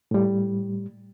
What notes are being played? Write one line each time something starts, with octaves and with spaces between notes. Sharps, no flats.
A2 G3